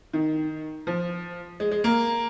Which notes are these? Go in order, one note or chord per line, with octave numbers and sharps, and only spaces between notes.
D#3
F3
G#3
G#3
A#3